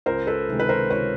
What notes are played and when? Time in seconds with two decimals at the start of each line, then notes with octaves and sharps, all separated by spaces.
0.06 C#2 A#4 C5
0.27 A4 B4
0.49 C3 D#3 G#3
0.60 B4
0.69 A#4 C5
0.90 C#2 B4 C#5